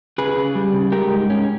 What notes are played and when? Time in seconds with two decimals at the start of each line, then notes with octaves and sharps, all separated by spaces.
0.18 C#3 G#4 B4
0.36 C#3
0.55 G3
0.74 C#3
0.92 G#3 G4 A#4
1.11 G#2
1.30 C#4